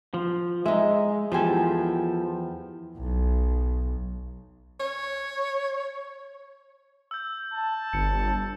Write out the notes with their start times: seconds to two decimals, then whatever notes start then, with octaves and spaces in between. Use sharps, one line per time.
0.14 F3
0.66 G#3 D#4 E5
1.32 E2 F3 G4 A4 G#5
2.97 B1
4.80 C#5
7.11 E6 G6
7.54 A5
7.93 G1 C#7